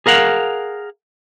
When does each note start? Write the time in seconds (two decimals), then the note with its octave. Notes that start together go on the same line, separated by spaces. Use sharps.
0.06 G#4 A#4 F5 F#5